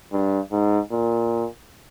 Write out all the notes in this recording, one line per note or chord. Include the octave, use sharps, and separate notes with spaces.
G2
G#2
A#2